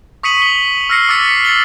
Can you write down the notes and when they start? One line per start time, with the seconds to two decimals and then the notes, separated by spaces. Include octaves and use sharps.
0.23 C#6 D#6 B6 C#7 D#7 F#7
0.42 G7
0.90 E6 F6 A#6 C7 C#7
1.09 D6 E6 F6 A6 B6 C#7
1.45 A6 C#7 F#7 G7